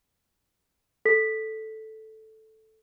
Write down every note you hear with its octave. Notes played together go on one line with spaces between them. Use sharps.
A4 B6